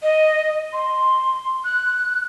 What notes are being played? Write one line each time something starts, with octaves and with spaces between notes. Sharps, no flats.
D#5
C6
F#6